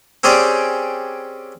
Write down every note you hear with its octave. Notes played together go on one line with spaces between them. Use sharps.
C4 C#4 G4 G#4 D5